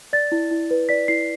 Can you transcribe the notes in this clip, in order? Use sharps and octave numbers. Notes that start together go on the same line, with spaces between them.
D5 A6
E4
E4
B4
D5 B6
E4 C7